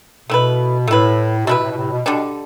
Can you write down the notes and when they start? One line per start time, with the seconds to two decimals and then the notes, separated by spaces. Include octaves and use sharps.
0.29 B2 A3 E4 B4
0.88 A2 A3 E4 B4
1.42 C3
1.46 B2 A3 E4 B4
1.58 B2
1.62 A2 C3
1.71 B2
1.76 A2 C3
1.91 B2
2.06 B2 D3 G3 D4